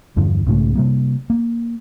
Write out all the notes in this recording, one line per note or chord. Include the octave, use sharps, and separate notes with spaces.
E2 G2 D3 F3
B1 G#2 C#3 A3
C3 G3 A#3
A#3